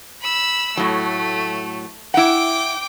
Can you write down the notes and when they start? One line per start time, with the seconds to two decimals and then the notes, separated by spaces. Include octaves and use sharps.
0.22 B5 E6
0.77 A2 F#3 A3
2.14 E4 F#5 G5 D6